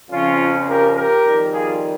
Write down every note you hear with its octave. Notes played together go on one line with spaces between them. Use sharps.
F2 C#3 F3 C#4 F4
G4 A#4
G4 A#4
F2 D#3 G3
F4 G#4